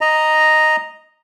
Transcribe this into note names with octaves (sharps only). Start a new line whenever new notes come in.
D#5 A#5